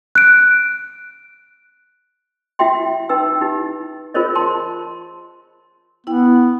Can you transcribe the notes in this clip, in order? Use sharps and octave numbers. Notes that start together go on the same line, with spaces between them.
F#6 D7
E4 F#4 E5 G5 C6
D#4 B4 G5 E6
D#4 E4 G4
F4 G#4 A#4 C5 C#5 D#5
A5 C6
B3 E4 G5